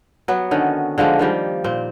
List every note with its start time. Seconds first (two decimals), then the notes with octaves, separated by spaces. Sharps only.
0.28 F#3 B3
0.51 D3 D#3 C#4
0.98 D3 F3 G#3 A#3
1.19 D#3 F3 G3
1.64 A#2 C4